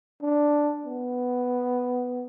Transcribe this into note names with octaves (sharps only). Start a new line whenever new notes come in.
D4
B3